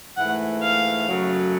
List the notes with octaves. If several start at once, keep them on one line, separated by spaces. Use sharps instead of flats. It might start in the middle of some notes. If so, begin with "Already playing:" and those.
G#2 E3 A3 F#5
F5
F#2 C#3 F#3 A3